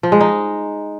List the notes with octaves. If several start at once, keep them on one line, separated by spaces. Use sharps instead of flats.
F3
G#3
D#4